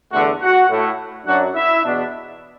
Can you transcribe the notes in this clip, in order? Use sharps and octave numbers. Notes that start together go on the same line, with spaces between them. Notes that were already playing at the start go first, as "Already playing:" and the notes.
E2 D3 A3 F#4 F#5
F#4 F#5
A2 A3 E4
F#2 F#3 D4 F#4 F#5
E4 E5
E2 B2 B3 D4